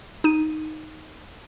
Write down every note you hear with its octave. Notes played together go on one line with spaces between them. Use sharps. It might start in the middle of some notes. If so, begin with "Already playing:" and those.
D#4 D#7